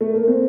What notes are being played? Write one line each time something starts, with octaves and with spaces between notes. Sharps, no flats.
A3
A#3
C4